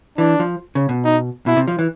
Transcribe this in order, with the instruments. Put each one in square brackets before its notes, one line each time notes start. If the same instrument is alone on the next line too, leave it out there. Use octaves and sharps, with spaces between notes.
[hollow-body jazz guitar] E3 [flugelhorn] D4
[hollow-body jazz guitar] F3
C#3
B2
[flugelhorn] D#4
[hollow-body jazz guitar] B2 [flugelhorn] E4
[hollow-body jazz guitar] C3
F3
E3